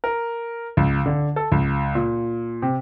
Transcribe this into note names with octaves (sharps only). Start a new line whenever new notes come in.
A#4
C#2
D3
A4
C#2
A#2
C3